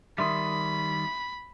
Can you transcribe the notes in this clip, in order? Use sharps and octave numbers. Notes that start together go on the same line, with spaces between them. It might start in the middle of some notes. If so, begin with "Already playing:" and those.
D#3 G3 E5 B5 C6 D#6